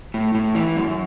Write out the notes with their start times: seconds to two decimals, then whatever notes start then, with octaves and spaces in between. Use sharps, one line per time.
0.14 A2
0.35 A2
0.55 E3
0.77 F#2